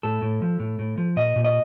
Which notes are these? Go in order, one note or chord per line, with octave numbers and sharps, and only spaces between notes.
A2 A4
A2
F3
A2
A2
F3
A#2 D#5
A#2
D#5